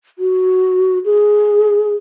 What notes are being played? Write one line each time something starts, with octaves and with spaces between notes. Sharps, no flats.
F#4
G#4